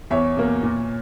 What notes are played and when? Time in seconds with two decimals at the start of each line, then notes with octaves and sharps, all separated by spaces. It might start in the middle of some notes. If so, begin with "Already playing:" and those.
0.10 E2 C#5 E5
0.36 B2 A#3
0.63 A#2